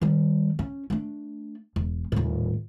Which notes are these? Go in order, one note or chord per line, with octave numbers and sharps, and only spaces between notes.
D#3 G3
C#4
A3 D4
E1
D#1 A2